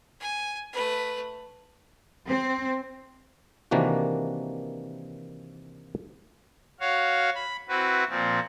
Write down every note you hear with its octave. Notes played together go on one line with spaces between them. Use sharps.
G#5
A3 B4
C4
C3 D#3 E3 A#3 D4 F#4
F#4 C#5 F5
B5
C4 E4 F#4 B4
A#2 F3 C4